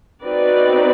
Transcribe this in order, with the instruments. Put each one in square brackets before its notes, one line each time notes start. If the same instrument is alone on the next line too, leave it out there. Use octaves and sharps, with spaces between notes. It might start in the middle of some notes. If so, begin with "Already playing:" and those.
[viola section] C4 D#4 F#4 B4 D5